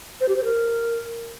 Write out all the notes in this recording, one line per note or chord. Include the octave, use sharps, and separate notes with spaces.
C5
G4
C5
A#4